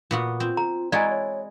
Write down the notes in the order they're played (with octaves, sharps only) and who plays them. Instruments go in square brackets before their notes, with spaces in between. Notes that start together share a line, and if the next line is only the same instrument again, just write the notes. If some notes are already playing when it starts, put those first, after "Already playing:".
[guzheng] A#2 B3 F#4
[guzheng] C4 [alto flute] F4
[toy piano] A#5
[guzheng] G#3 E4 F#4 [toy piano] D5 D#5 G#5 [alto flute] A#5
[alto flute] C#5